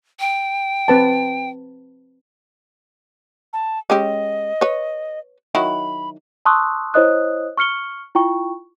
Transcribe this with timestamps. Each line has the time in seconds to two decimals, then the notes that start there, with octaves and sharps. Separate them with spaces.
0.20 G5
0.88 C4 B4 A5
3.53 A5
3.90 G#3 C#4 G4 D#5
4.61 B4 C#5
5.55 D#3 F#3 E4 B5
6.45 A5 C6 C#6 D#6 E6 F#6
6.94 E4 C5 C#5 D#5 D#6 F#6
7.57 C#6 F6 C#7 G7
8.15 E4 F4 G5 C#6